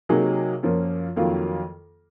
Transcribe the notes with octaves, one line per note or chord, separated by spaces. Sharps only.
C3 F#3 A#3 D#4 G#4
F#2 F3 A#3
F2 D#3 F#3 A#3 F4